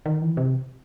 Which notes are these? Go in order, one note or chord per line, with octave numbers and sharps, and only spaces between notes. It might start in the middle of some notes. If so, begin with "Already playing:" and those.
D#3
E3
C3